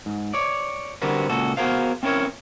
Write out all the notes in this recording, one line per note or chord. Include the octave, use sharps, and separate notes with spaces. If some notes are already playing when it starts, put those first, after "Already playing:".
G#2
C#5 D5
D3 G3 C4 F#4 A#4 B4
C#2 A#2 F#4 A4
B3 F#4 G#4 A#4 C5 F5
C4 C#4 E4 A#4 C#5